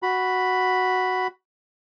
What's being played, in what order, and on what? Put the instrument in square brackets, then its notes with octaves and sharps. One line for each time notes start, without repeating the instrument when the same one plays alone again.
[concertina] F#4 B5